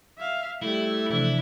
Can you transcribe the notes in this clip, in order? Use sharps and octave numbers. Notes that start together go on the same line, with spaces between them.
E5 F5
G3 A3 E4
C3 E3 F3 D4 E4